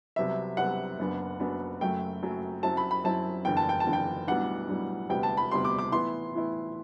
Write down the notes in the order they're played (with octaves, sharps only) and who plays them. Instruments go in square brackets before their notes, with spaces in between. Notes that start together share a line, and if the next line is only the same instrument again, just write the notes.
[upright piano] C2 C3 F#3 B3 E5
C2 C3 F#3 B3 F#5
F#1 F#2 F#3 B3 D4
F#1 F#2 F#3 B3 D4
F#1 F#2 F#3 A3 G5
F#1 F#2 F#3 A3
F#2 F#3 C4 E4 A5
B5
B5
F#2 F#3 C4 E4 A5
F#1 E2 D3 G5
A5
G5
A5
F#1 E2 D3
G5
B1 A2 G3 B3 D4 F#5
B1 A2 G3 B3 D4
E1 D2 C3 G3 B3 G5
A5
B5
E1 D2 C3 G3 B3 C6
D6
D6
A2 E3 B3 E4 C6
A2 E3 B3 E4